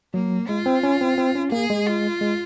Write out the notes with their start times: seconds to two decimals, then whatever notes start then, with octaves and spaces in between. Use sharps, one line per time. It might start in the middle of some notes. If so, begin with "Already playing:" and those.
0.14 F#3 A#3
0.48 G#3 F4
0.66 C4
0.83 C#4
1.01 C4
1.18 C4
1.35 C#4
1.52 A#3 G#4
1.70 G#3
1.86 F4
2.21 G#3